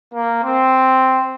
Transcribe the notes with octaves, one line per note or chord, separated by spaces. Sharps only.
A#3
C4